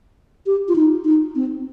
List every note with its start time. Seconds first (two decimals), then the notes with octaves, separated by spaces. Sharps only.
0.46 G4
0.68 F4
0.75 D#4
1.05 D#4
1.35 C4